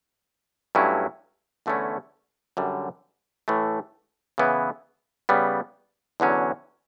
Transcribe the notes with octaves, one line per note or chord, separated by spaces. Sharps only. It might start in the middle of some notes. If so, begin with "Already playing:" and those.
G2 F#3 A3 C#4 E4
E2 D3 A3 C#4 E4
F#2 D3 G3
A2 E3 A3
C#3 E3 B3 E4
C#3 G3 B3
E2 D3 F#3 C#4